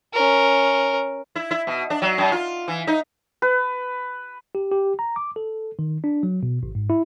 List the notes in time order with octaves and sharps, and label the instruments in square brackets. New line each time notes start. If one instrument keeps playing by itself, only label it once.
[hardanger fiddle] C#4 A#4
[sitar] E4
E4
B2
D4
F#3
F#2
F4
E3
D#4
[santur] B4
[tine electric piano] G4
G4
A#5
D6
A4
D#3
D4
F#3
B2
G#1
G#2
E4